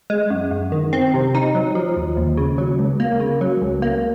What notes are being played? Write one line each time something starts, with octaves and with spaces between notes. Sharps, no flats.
G#3
F#2
F#2
D#3
C4
C3
D#4
F#3
F3
D#2
D#2
C#3
F#3
C#2
A#3
C#3
F#3
C#2
A#3